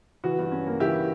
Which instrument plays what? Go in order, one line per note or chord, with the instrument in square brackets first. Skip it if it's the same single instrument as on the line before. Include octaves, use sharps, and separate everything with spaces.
[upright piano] E3 F#4
G2
C#4
A#3
E3 E4 G4